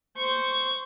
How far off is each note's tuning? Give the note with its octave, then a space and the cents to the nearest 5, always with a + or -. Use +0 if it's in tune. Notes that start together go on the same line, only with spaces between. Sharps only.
C5 -5 C#6 +0